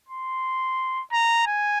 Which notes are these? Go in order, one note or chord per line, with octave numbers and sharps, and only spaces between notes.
C6
A#5
G#5